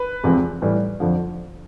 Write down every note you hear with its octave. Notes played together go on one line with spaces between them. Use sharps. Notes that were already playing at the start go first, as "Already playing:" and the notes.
Already playing: B4
E2 C3 F3 G#3 C4
A2 E3 G3
F2 D3 F3